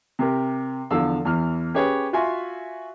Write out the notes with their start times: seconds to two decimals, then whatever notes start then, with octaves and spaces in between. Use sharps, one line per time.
0.19 C3 G4 A#4
0.91 E2 D3 F3 F5 E6
1.25 E2 E3 F6
1.74 C#4 G4 G#4 B4 C#5 G5
2.13 F4 F#4 E5 G#5 C6